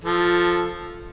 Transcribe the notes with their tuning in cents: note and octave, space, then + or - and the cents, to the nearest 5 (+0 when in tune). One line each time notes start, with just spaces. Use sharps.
F3 +0 A4 +0